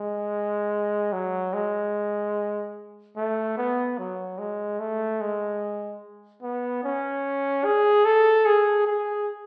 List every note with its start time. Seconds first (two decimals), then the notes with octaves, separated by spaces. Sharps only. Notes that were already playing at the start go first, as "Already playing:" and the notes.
Already playing: G#3
1.13 F#3
1.54 G#3
3.17 A3
3.57 B3
3.98 F#3
4.38 G#3
4.80 A3
5.21 G#3
6.42 B3
6.84 C#4
7.65 G#4
8.05 A4
8.46 G#4
8.87 G#4